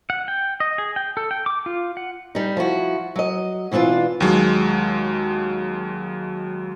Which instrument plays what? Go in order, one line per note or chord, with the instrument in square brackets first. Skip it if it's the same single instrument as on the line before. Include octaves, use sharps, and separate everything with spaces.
[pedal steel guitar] F#5
G5
D#5
G#4
G5
A4
G5
D6
F4
F#5
[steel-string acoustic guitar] G3 D#4
F3 E4 F#4
F#3 D#5
B2 E3 C4 D4 F4
[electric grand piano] D#2 F#3 G#3